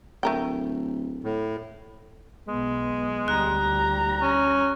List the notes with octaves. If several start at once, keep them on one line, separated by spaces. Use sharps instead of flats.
D1 A3 A#4 G5
A2
B1 G#3 B3
D2 G3 A#5 F#6
C#4